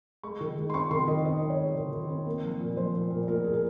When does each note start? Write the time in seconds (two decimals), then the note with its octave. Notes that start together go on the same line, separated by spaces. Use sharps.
0.23 G#3 C#6
0.40 D#3
0.57 G#3
0.70 C6
0.74 C4 C#6
0.91 D#3 C6
1.07 D#3 D#5
1.24 C4 D#5
1.42 D#3
1.50 C#5
1.58 G#3
1.75 D#3
1.92 D#3
2.09 C4
2.26 A#3
2.43 F3
2.60 A#2
2.77 F3 C5
2.94 A#2
3.11 A#2
3.28 A#2 A#4
3.44 A#2 G#4
3.54 A#4